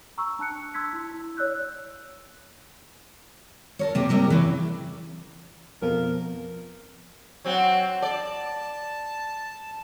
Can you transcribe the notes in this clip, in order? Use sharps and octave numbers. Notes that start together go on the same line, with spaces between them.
A#5 C#6 E6
D4 A5 F#6 C#7
C6 E6 G#6 B6
E4
E4
C#5 D5 E6 F#6 G6
A4 A#4 C#5
C3 A#3
G#2 C3 G3 A#4
C#3 E3
F2 B2 F3 A#4
F#3 C4 F#4
D5 A5